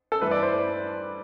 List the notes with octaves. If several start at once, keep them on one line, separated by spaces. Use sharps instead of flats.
A4
G2 E3 A3 E4 B4
D5
C5